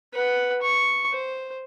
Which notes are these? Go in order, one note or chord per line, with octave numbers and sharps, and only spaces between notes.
B4 F#5
C#6
C5